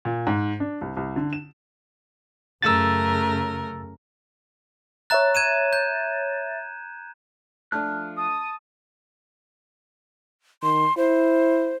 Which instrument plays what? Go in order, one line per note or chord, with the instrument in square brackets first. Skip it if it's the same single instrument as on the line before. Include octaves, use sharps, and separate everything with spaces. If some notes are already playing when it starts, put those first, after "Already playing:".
[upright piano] A#2
G#2
D4
C2
C2
D3
E7
[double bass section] F#2 C#3 [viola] A3 A#4 [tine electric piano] E6 A6
[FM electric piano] C#5 E5 A6 [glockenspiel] A#5 F#6
[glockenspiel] G#6 D#7 E7
G6
[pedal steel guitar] F3 F6 F#6 [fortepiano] A3 D4
[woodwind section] A5 D#6
[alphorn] D#3 [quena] C6
[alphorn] E4 [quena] C5